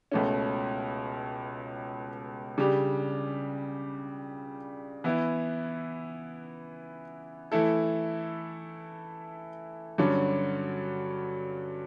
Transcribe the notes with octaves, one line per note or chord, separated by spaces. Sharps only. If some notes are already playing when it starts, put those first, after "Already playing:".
C#2 B2 A3 C#4
C#3 G3 D4 G4
E3 B3 E4
E3 A3 E4 A4
G2 D3 F#3 C#4